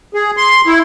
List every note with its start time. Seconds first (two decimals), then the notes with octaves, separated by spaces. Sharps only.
0.14 G#4
0.37 C6
0.67 E4